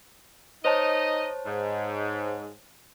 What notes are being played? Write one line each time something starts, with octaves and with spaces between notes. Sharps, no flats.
D#4 C5 C#5 D#5 A5
G#2